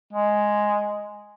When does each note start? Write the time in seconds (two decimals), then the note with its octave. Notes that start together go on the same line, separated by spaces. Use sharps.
0.13 G#3